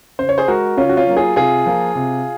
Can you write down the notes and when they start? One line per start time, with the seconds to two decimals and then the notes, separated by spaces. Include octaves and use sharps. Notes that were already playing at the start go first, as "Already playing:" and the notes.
0.19 C#3 C5
0.29 C#5
0.38 G#4 C5
0.48 G#3 F#4 A#4
0.77 C#3 C#4 F4
0.89 F#4
0.97 C#4 F4
1.06 F#3 A#3
1.17 F4 G#4
1.36 C3 F4 G#4
1.66 F3 A#3
1.95 C3